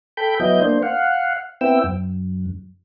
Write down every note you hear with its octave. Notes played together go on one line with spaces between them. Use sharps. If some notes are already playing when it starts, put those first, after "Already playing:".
A4 G5 B5 G6
F#3 B3 E4 D#5 G6
A#3 D4 C5
F5 F#5
B3 C4 E4 G5 E6
F#2